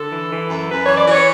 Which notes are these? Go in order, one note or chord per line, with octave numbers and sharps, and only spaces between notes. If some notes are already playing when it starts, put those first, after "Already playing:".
Already playing: D3 A4
E3
E3
F#2
F#2 B4
E3 C#5
D5
E3 C#5